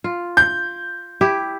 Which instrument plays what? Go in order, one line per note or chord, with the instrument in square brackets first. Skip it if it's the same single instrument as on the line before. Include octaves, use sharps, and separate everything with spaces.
[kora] F4
[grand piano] G6
[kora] E4 G4